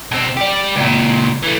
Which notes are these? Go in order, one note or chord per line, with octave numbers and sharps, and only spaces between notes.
B2 C4
G4 D5
C#2 A#2
E3 A3